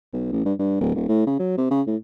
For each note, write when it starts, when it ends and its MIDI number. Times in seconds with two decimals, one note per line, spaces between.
0.13 0.31 35
0.32 0.42 33
0.45 0.54 43
0.59 0.79 43
0.80 0.92 26
0.95 1.07 27
1.08 1.25 45
1.27 1.36 49
1.39 1.56 54
1.58 1.68 48
1.71 1.81 49
1.87 1.96 45